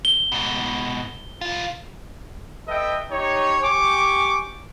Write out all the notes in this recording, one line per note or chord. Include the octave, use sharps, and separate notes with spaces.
G7
G#2 B2
C2 F4
A4 B4 D#5 E5 G5
D#4 G4 C#5
G4 G#5 C#6 D6